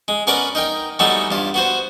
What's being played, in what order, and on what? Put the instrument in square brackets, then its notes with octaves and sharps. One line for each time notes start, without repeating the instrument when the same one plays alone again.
[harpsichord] G#3
B3 C#4 A#4 B4 C#5 D5
D#4 A#4 G5
E3 F#3 G3 A3 B3 D#4
G2 F4
B3 F#4 C5